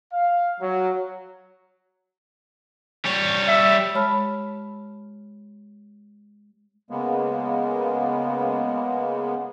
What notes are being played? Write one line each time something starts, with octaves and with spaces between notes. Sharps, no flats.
F5
F#3
G3 C#5
E5
G#3 G4 C#5 A5 B5 F6
C#3 G#3 A#3 B3